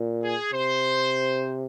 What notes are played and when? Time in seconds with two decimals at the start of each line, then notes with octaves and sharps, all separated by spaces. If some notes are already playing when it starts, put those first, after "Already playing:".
Already playing: A#2
0.23 G#4
0.52 C3 C5